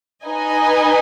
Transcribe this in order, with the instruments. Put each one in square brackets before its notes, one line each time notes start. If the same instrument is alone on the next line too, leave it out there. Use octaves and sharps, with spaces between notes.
[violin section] D#4 B4 D#5 G#5